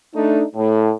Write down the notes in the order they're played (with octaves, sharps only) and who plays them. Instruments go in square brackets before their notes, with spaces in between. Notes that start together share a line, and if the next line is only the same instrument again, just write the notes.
[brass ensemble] A3 D4 D#4
A2